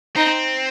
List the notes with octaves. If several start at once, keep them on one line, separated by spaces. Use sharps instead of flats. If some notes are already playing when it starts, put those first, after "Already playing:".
C4 D#4